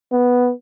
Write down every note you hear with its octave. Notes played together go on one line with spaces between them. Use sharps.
B3